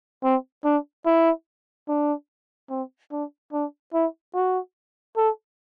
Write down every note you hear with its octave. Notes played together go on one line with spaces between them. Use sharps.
C4
D4
E4
D4
C4
D4
D4
E4
F#4
A4